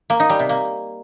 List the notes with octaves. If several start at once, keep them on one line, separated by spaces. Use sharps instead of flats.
A#3
D#4
G3
C3
A#3